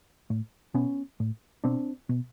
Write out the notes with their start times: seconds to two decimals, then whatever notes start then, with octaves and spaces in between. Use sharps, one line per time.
0.30 A2
0.74 B2 B3 C#4
1.20 A2
1.64 B2 C4 D4
2.09 B2